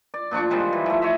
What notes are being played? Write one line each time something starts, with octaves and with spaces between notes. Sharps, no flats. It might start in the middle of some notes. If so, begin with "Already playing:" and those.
D5
A#2 F3 D4 C#6
D#3 F3 G3 G#3
E3
F3 A3
C#5 D#5 E5